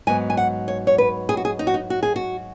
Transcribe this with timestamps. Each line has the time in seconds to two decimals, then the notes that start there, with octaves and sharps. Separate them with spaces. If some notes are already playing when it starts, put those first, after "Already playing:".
0.07 G#2 F#3 B3 G#5
0.30 G#5
0.37 F#5
0.68 C#5
0.87 C#5
0.98 B4
1.29 G#4
1.37 F#4
1.45 G#4
1.59 D#4
1.67 F#4
1.74 D#4
1.90 F#4
2.03 G#4
2.16 F#4